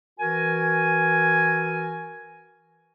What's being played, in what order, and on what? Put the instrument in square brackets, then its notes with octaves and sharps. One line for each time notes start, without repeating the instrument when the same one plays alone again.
[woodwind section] E3 F#4 A#4 G#5